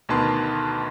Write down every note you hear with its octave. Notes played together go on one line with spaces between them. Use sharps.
D2 B2 D#3 B4 A5 C6